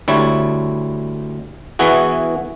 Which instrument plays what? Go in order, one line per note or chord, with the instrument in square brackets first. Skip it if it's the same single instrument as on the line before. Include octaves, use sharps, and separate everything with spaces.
[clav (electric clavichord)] D2 G3 E4 C#5
E3 B3 E4 F#4 G#4